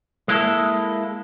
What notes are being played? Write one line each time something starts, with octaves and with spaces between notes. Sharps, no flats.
G#3 A#3 E4 A4